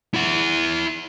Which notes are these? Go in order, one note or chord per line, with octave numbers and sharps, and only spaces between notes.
E4 F#5